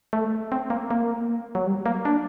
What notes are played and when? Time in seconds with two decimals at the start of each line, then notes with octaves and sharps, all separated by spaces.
0.13 A3
0.52 C4
0.70 A#3
0.91 A#3
1.55 F#3
1.67 G3
1.86 A#3
2.05 D4